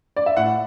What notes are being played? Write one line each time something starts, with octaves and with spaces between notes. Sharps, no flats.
D5
E5
A2 F#5